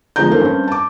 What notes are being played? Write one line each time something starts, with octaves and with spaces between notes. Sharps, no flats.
G1 F3 G#3 D4 A#5 G6
D#3 A3 A#3 C4
G2 C4 C#4
A5 D6